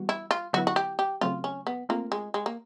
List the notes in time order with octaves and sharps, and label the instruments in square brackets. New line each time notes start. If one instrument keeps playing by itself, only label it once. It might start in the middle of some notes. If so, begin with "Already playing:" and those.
Already playing: [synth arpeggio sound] E3 G3 B3 F#4
[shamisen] E4
F4
[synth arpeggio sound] D3 F#3 B3 E4 [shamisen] F#4
[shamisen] F#4
G4
G4
[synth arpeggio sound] C#3 F#3 A3 C4 [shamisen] F4
[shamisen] C#4
B3
[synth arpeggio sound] A3 C4 F4 A#4 [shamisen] A#3
[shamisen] G#3
G#3
A#3